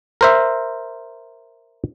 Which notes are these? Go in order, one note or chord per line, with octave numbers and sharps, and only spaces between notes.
A#4 C5 E5